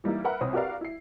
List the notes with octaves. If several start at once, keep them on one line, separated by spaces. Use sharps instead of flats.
E3 G3 A#3 D#4 E4
A#4 B4 E5 F#5 B5
C2 C4 C#5 D#6
F#4 G4 A#4 B4 D5 F5
E4 C7